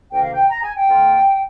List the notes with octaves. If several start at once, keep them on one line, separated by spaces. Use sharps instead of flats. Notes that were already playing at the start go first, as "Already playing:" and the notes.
D2 C3 D#3 A#3 G5
F5
G5
A#5
G#5
G5
F2 D#3 A#3 F4